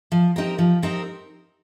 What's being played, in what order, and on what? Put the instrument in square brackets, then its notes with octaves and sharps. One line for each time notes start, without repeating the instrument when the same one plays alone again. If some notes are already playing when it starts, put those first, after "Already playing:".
[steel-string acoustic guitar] F3
C4 D#4 G4 A#4
F3
C4 D#4 G4 A#4